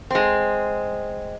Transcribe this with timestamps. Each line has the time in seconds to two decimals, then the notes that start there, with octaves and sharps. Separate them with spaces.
0.11 G#3 C4